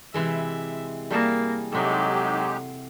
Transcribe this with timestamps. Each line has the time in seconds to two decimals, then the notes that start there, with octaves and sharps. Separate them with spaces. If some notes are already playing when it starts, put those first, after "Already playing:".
0.14 C3 E3 G#3 E5
1.11 G3 A#3 G#4 A5
1.72 C3 F#3 G#3 D#4 G4 A4